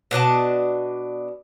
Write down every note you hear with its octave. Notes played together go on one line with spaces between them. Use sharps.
B2 D4 D#5 A5